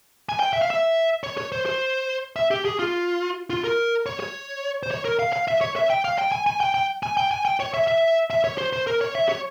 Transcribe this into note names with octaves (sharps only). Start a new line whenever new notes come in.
G#5
G5
E5
F5
E5
C#5
C#5
C5
C5
E5
G4
G#4
F4
F4
A#4
C#5
C#5
C5
C#5
A#4
F5
F5
E5
C#5
E5
G5
F5
G5
G#5
G#5
G5
G5
G#5
G5
G#5
G5
C#5
E5
E5
E5
C#5
C5
C5
A#4
C#5
E5
C#5